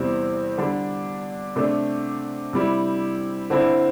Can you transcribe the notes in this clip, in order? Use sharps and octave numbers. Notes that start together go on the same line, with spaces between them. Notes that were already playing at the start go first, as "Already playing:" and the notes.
Already playing: E2 C3 G3 C4 E4
D3 G3 D4
C3 A3 D4
C3 G3 E4
D3 C4 E4